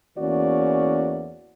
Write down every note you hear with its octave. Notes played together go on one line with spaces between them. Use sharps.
E2 E3 A#3 C#4 F#4 D5